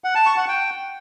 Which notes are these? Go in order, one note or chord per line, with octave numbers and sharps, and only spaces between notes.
F#5
A5
C#6
F#5
G5